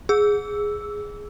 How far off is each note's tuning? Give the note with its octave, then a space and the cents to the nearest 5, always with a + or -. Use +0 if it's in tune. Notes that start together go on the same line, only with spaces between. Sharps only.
G#4 +0 E6 +0